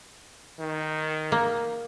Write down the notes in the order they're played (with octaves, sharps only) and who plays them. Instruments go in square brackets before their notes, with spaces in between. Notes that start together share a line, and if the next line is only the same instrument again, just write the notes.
[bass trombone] D#3
[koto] A#3